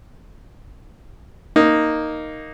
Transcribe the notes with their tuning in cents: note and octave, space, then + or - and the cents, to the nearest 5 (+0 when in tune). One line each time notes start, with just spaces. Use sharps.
A#3 +0 D#4 +0